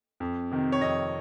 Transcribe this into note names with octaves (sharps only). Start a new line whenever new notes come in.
F2
C3 D#3
C#5
F2 D#5